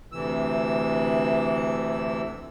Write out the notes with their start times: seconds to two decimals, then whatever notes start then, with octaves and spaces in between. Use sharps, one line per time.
0.12 D2 C3 E3 E6